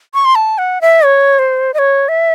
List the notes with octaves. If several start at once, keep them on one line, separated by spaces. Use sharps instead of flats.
C#6
C6
A5
F#5
E5
C#5
C5
D#5
C#5
E5